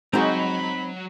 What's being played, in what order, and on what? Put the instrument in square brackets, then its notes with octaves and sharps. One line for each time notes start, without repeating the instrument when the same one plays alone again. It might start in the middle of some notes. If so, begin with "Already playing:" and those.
[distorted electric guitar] F#3 A#5 [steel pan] G#3 F#4 G#4 [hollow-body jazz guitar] C4 D#4 [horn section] B5